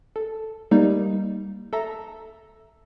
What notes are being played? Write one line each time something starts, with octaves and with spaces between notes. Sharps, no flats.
A4
G3 A#3 D#4
A4 E5 A#5